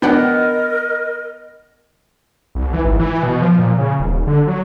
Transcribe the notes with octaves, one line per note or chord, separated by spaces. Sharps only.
B3 D4 A#4 D#5 F#5 G5
C2
E3
G#1
E3
B2
F3
A#2
C#3
D#1
D3
F#3